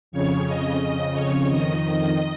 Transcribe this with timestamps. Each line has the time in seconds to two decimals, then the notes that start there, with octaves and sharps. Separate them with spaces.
0.12 F2 C#3 C#5
0.46 D#5
0.79 F2 C#3 D#5
1.14 C#5
1.47 F2 D#3 D#5